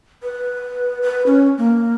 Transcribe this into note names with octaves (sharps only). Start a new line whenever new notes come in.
B4
B4
C#4
A#3